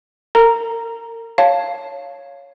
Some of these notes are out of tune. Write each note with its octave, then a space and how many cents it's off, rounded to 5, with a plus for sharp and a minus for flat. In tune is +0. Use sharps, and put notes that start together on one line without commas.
A#4 -35 A#5 +0
C#5 +0 F5 +0 A5 +0